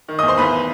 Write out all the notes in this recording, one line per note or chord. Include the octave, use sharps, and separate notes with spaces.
D#3
D#5 D#6
E2
C5 C6
E2 B4 B5